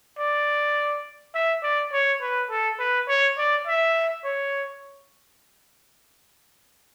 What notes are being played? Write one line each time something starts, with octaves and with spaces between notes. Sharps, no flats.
D5
E5
D5
C#5
B4
A4
B4
C#5
D5
E5
C#5